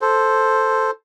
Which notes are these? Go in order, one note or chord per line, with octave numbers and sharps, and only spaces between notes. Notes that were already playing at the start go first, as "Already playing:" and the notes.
A4 C5